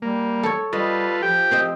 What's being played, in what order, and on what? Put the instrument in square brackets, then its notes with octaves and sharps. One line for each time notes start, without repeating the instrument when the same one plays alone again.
[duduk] G3 [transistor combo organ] A#3
[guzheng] A4 C#5
[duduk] G3 [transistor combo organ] F4 A4 B4 [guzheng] D#5
[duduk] F3 [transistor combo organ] G4 G5
[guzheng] C4 C5 D#5